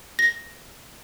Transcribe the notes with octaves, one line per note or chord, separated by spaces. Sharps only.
A#6